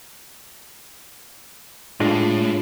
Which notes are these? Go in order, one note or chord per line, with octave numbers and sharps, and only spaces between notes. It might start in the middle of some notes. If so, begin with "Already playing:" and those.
A2 G#3 D4 F4